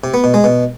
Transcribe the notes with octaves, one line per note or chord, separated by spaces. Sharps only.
C3
B3
B2
G#3
B2